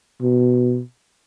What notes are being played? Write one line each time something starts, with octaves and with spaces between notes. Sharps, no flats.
B2